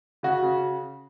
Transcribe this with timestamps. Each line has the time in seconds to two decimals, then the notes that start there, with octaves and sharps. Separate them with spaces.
0.23 C#3 F#4
0.42 C#3